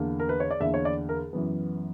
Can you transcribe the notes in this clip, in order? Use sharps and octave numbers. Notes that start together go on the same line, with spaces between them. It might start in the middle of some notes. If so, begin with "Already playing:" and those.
Already playing: E2 D3 A#3
A#4
B4
C#5
D5
E2 D3 A#3 E5
C#5
D5
A#4
F#2 E3 B3